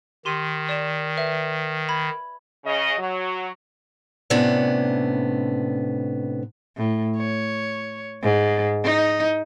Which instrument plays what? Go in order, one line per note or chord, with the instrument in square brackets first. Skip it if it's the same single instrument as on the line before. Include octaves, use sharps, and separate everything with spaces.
[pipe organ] D#3 [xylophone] G4 C6 D#7
[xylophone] D5 E7
B4 E5
B5 G#6
[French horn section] C#3 D#5
F#3
[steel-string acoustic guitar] A2 C3 B3 C#4 D4
[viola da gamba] A2
C#5
G#2
D#4